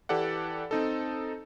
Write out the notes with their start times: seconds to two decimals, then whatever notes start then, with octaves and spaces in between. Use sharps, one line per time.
0.09 E3 G4 A4 D5 F#5
0.71 C4 D#4 A4